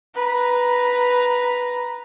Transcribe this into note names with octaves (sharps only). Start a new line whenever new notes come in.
B4 A#5